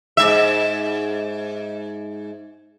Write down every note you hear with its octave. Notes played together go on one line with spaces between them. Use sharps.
G#2 E5